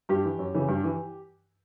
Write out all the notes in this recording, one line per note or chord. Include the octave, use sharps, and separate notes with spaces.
G2 G4
E3
F#2
C#3 E3
G2
E3